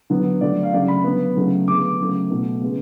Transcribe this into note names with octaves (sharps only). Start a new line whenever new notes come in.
D3 F#3 B3
D3 F#3 A3 D5
F5
C#3 F#3 A3 D5
B5
D3 F#3 B3
C#3 F#3 A3
D3 G#3 B3 D6
C#3 F#3 A3
B2 A3
C#3 G#3 B3